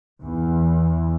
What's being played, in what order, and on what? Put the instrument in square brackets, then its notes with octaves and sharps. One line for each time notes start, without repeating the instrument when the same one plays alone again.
[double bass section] E2 E3